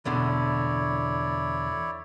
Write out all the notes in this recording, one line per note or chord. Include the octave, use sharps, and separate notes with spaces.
E2 B2 D3 E4 C#5 D5